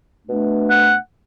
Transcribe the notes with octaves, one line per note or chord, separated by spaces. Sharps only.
B2 A3 D4
F#5